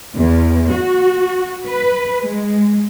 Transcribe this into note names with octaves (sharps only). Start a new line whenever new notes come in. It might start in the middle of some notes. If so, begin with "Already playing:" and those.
E2
F#4
B4
G#3